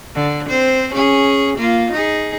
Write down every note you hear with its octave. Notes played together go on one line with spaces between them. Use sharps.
D3
C4 C5
C#4 G#4
A#3 F4
D#4 G#4